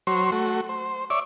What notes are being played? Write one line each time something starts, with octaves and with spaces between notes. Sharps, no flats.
F#3 C5 C#5 C6
A3 F#4
C5
C#5 D5 E5 D6